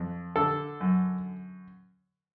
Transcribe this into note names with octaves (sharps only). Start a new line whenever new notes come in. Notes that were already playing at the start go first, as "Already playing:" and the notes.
Already playing: F2
D3 A4
F#2